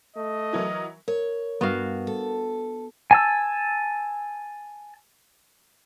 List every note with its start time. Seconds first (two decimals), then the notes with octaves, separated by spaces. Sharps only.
0.16 A3 D#5
0.53 E3 F#3 A#4
1.08 A#4 C#5
1.61 G2 B3 F#4 F5
2.07 A4
3.11 G#5 A5 E6